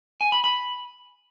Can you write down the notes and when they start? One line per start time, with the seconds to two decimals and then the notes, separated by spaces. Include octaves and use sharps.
0.21 G#5
0.32 B5
0.44 B5